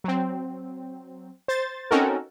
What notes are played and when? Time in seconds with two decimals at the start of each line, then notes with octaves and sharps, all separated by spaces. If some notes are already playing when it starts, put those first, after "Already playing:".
0.04 F#3 C4
1.48 C5 A6
1.91 C4 C#4 D#4 F#4 A4 A#4